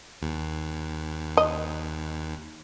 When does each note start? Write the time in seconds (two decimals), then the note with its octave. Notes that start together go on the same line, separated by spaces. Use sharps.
0.22 D#2
1.37 D#5